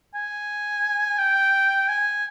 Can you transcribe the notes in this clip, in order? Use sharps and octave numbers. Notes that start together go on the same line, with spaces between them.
G#5
G5
G#5